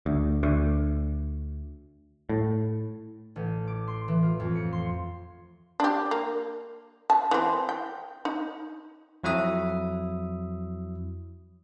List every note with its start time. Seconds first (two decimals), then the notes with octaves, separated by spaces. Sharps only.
0.06 D2
0.43 D2
2.29 A2
3.36 A1
3.67 D6
3.88 C6
4.08 E3
4.23 F4
4.40 F2
4.55 C#7
4.73 C6
5.80 D4 G4
6.11 A#3
7.10 A5
7.31 E3 C4
7.69 G5
8.25 D#4
9.24 F2 F#3 E4 E5 D#6